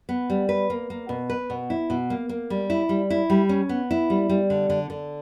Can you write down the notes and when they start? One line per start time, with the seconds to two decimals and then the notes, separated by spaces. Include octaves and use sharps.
0.09 B3
0.30 G3
0.49 B4
0.70 A#3
0.90 A#3
1.09 B2
1.30 B4
1.50 B2
1.70 E4
1.90 B2
2.10 A#3
2.29 A#3
2.50 G3
2.70 E4
2.89 G3
3.10 E4
3.30 G3
3.49 C#4
3.69 B3
3.91 E4
4.10 G3
4.29 G3
4.50 D3
4.70 D3
4.90 D3